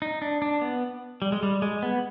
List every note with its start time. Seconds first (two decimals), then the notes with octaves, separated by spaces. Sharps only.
0.02 D#4
0.22 D4
0.42 D4
0.61 B3
1.22 G3
1.32 G#3
1.43 G3
1.62 G#3
1.82 B3